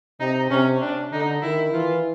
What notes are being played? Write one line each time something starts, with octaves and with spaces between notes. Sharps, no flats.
C3 D#4
C3 C#4
D4
D3 D#4
D#3 E4
E3 F4